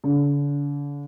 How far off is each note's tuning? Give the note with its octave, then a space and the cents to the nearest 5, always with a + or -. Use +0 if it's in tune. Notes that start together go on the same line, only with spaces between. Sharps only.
D3 -40